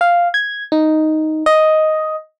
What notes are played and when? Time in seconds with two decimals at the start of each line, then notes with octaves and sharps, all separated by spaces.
0.01 F5
0.34 G#6
0.72 D#4
1.46 D#5